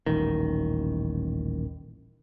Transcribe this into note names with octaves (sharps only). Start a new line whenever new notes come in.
D#1 A1 D#3